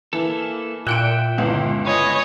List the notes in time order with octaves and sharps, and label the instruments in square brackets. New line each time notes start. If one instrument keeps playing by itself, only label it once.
[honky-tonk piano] E3 [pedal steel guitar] A#3 E4 A4
[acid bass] A#2 [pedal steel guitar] E5 G5 [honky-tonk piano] F#6 C#7 D7
[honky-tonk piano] G1 C#2 E3
[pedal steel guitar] B4 G#5 [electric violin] C#5 D#5